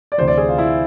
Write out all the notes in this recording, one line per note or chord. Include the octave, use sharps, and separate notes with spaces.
D5
D2 C3 E3 C5
D5
G#4
F4
E4